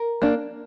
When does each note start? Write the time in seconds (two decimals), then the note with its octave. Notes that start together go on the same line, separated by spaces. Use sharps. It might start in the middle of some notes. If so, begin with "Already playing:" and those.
Already playing: A#4
0.22 A#3 D4